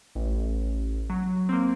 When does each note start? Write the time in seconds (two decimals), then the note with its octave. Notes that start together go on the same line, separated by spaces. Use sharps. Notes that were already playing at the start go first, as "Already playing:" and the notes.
0.15 A1
1.10 F#3
1.49 A#3 C4